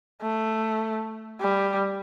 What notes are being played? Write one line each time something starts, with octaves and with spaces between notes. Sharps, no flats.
A3
G3